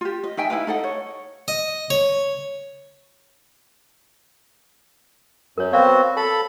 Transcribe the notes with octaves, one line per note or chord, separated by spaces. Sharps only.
F4 G4
D#5
D#4 E5 G5 G#5
D#4 E4 B4 F5
D#4 A4 D#5 F#5
C#5
D#5
C#5
F#2 A#4 C#5
B3 C4 F#4 D5 F5 B5
A4 A5 B5